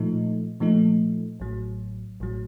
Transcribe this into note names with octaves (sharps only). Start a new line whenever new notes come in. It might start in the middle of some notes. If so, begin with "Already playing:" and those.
Already playing: A#2 F3 A3 D#4
A#2 F3 A3 D#4
A1 A2 F#3
A1 A2 F#3